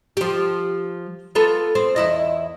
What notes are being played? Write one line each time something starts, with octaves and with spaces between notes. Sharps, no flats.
F3 G4
B3 F4 A4
C4
E2 E4 D#5